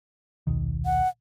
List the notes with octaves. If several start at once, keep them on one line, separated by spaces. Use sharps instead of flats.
D#1 B1 D#3
F#5